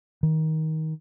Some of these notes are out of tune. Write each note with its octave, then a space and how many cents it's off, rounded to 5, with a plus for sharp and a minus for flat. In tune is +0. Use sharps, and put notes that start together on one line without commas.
D#3 +20